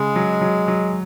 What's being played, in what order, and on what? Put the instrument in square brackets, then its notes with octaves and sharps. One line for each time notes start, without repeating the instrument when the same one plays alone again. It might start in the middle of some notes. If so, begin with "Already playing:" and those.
Already playing: [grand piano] C#3 [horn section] G#3
[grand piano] F#3
F#3
F#3